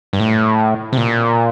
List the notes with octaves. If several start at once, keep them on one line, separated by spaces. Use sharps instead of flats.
G2
A2
C3
A#2